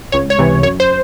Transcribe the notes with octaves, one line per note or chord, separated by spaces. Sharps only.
C#2 C#5
C#5
C3 E3
F#2 C#5
C5